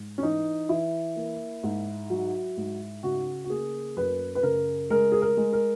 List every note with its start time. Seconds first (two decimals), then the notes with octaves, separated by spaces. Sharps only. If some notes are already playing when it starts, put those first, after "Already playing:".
Already playing: G#2
0.18 C#4
0.23 E3 D#4
0.69 E3 E4
1.16 A#3
1.63 G#2
2.10 F#3
2.57 G#2
3.03 C#3 F#4
3.44 F#4
3.50 A#3 G#4
3.97 F#2 B4
4.35 B4
4.43 C#3 A#4
4.90 G#3 A#4
5.12 G#4
5.21 A#4
5.37 G#3
5.53 A#4